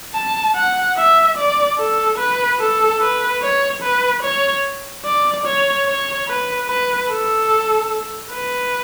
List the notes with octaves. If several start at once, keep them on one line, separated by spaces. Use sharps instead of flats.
A5
F#5
E5
D5
A4
B4
A4
B4
C#5
B4
C#5
D5
C#5
C#5
B4
B4
A4
B4